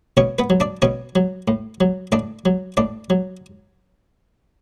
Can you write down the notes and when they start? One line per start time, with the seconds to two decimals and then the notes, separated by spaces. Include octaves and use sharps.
0.17 B2 C#4 C#5
0.39 B3 B4
0.50 F#3
0.60 D4 D5
0.82 B2 C#4 C#5
1.15 F#3
1.48 A2
1.81 F#3
2.12 A2 D4 D5
2.45 F#3
2.77 A2 D4 D5
3.10 F#3